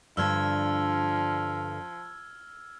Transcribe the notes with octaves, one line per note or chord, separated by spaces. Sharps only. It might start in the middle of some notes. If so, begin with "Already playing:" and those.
G2 D3 F3 D4 E6 F6 G#6